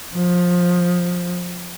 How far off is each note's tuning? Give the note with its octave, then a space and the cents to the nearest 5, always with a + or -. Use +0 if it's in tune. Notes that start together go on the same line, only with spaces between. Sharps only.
F3 +20